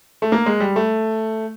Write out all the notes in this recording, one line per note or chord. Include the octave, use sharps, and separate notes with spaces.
A3
A#3
G#3
G3
A3